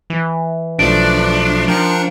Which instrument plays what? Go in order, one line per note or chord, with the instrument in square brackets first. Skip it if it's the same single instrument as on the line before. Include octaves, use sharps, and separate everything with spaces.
[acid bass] E3
[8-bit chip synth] B1 F3 A3 [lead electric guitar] D4 [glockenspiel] D7
[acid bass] F3 [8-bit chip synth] A#4 G5 C#7